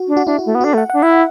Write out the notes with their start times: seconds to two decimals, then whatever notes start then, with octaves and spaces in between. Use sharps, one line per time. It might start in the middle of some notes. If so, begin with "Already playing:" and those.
Already playing: F#4
0.08 D4
0.17 F#4
0.27 D4 E4
0.39 F#4
0.46 A3
0.55 B3
0.61 F#4
0.64 D4 A4
0.74 A3 F#5
0.90 F#5
0.93 D4
1.02 E4 E5